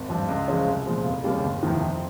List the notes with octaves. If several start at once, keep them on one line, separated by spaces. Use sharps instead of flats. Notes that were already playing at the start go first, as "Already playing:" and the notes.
Already playing: G#1
G2 F3 C4
C#2
C#3 F3 G#3 C#4
C2
A#2 F3 G#3
F1
D#2 C#3 G3 A#3
G1
F2 C3 D#3
F2